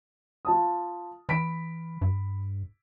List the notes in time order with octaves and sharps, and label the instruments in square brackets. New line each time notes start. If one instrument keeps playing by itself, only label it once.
[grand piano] F4 A5 D#6
[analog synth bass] E3 [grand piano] B5 B6 D7
[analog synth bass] G2